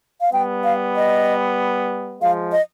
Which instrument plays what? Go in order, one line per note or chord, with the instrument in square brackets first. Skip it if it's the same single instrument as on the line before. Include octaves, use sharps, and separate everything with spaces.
[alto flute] F5
[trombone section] G3 B3 [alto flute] G5
[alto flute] F5
D#5
[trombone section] F3 G#3 [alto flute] F5
[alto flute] D#5